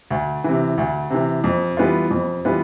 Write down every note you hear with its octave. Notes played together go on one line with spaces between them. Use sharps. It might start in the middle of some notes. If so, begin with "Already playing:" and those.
D2
C3 E3
D2
C3 E3
F2
E3 G3 B3 F4
F2
E3 G3 B3 F4